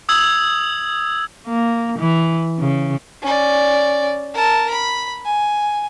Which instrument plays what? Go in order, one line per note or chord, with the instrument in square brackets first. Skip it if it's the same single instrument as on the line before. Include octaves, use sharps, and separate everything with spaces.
[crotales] D#6 E6 G#6 F#7
[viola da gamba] A#3
E3
C#3
[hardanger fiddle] C#4 D5
A#4 A5
B5
G#5